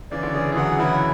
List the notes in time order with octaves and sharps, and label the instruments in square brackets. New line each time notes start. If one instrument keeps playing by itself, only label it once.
[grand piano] C#3 E3 [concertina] D5
[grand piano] D3
[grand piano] C#3 E3 [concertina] G#4
[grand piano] E3
[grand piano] D3 F#3 [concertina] F#5
[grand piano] C#3 E3 [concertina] E4